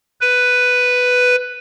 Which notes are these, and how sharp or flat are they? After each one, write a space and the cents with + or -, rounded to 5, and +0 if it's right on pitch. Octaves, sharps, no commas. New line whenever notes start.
B4 +5